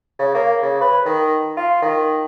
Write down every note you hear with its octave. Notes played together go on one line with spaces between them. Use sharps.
C#3
A#3
C#3
B4
D#3
F4
D#3